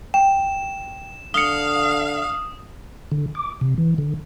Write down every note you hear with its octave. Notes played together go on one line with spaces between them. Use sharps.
G5 E7
D3 F5 D#6 C#7 G7
D3
D6
C3
E3
D3